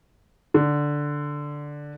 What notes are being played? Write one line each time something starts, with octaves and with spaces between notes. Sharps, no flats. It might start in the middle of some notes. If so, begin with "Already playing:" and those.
D3